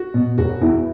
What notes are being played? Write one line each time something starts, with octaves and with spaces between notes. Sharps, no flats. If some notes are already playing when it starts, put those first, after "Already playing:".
Already playing: F#4
B2
E1 F#4
E2 E3 E4